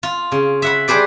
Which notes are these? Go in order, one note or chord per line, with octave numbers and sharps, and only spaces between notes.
F4
C#3
E5 F#5 B5
G3 G#4 B4 C5 D5